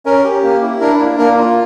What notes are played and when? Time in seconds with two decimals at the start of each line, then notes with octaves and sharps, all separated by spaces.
0.06 C#4 A#4
0.24 G4
0.43 A#3
0.62 E4
0.81 D4 A#4
1.00 A#3
1.18 A#3 A#4
1.37 F4